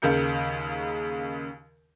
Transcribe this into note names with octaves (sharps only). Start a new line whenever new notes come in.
D#2 C#3 A#4 G6 C#7